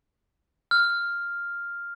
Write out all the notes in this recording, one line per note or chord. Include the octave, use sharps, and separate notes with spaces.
F6